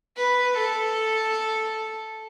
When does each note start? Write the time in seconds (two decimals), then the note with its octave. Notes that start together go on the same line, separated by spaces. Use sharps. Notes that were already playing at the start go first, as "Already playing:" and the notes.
0.17 B4
0.57 A4